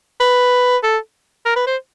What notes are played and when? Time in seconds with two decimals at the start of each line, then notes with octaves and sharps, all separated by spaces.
0.21 B4
0.83 A4
1.46 A#4
1.56 B4
1.67 C5